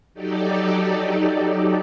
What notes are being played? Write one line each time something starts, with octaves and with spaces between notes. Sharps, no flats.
F#3 D#4 G4 A4 D5